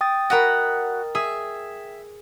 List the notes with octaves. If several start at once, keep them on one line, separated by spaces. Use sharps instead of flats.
G5 D#6 A6
F#4 A#4 D#5 F#5 B5
G#4 E5